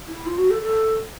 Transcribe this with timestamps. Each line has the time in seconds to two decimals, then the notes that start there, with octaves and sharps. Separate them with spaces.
0.08 E4
0.26 F4
0.38 F#4
0.51 A4
0.63 A4